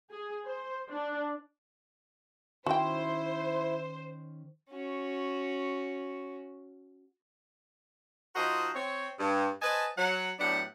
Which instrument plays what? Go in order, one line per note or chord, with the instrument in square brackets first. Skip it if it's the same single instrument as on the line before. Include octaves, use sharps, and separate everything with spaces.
[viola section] G#4
C5
D4
[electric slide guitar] D#3 C#4 [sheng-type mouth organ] E4 [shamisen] F#4 G5 [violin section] C5
[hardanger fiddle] C#4 F#4
[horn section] F3 D#4 F#4 A#4 C5 D#5
C4 C#5
G2
B4 C5 D#5 G#5 A5
F#3 F#5
A2 F#3 B3 D4 G4 F#5